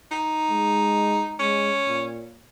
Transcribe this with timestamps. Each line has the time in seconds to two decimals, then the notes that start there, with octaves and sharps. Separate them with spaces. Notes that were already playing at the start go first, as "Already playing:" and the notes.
0.11 D#4
0.50 G#3
1.39 G#3 C#4
1.87 A#2